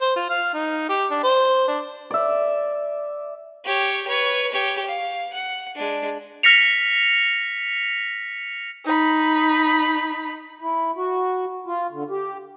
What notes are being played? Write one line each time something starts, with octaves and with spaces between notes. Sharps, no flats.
C5
F4
F5
D#4
G4
D4
C5
D4
D5 E5
G4 C#5
B4 C#5
G4 C#5
F5
F#5
G#3 D4
F6 A#6 B6 C#7 F7
D#4 B5
E4
F#4
F4
D3
G4